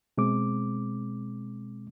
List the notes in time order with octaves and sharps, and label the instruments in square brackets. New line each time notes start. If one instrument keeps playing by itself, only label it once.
[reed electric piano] B2 G#3 C4 D6